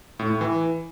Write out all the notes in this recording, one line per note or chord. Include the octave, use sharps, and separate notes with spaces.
A2
A2
E3